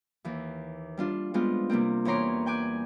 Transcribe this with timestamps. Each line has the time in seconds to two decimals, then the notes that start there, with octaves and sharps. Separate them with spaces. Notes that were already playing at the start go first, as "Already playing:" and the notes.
0.25 D#2 E3
0.97 G3 D4 F4
1.34 G3 G#3 B3 C4 F4
1.69 C3 G3 A#3 C4
2.05 E2 E3 C#5 A#5 C6 D6
2.46 G5 G#5 D6 F#6